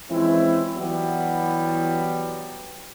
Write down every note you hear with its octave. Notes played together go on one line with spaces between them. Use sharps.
E3 F3 G#3 C4 C#4 E4
E3 F#3 G3 B3